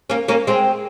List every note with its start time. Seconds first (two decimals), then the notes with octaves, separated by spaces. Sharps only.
0.10 A#3 C#4
0.28 A#3 C#4
0.47 G#3 C4